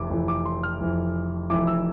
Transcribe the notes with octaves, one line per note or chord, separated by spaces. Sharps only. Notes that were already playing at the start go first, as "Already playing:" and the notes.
Already playing: F1 F2 E3 D6
F1 F2 E3
D6
C6
F6
F1 F2 E3
F1 F2 E3 D6
E6